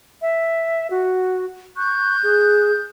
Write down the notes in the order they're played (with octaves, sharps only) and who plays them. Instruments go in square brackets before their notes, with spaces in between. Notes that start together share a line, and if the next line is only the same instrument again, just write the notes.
[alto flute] E5
F#4
[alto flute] C#6 [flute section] F#6 G6
[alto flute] G#4